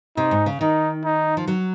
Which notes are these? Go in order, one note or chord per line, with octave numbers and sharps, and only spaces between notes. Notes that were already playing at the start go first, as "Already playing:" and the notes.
C3 D#4
G#2
C#3
D#3 D#4
D#4
F3
F#3